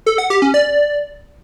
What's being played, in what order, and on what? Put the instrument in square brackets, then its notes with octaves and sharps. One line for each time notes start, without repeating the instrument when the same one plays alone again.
[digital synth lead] A4
F#5
G4
C#4
D5